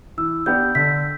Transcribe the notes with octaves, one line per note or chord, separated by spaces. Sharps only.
E3 E6
B3 D4 G4 G6
D3 B6